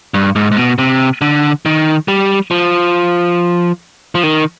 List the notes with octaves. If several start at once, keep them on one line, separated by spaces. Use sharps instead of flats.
G2
G#2
G#2
B2
C3
D3
D#3
G3
F3
F3
D#3